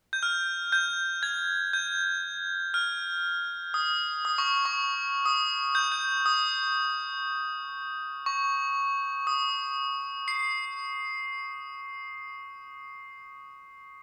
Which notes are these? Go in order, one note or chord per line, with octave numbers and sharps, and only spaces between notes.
G6
F6
G6
G#6
G6
F6
D#6
D#6
C#6
C#6
D#6
G6
G6
D#6
C#6
D#6
C7